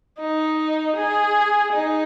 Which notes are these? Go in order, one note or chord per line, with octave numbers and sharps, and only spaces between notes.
D#4
G#4
D#4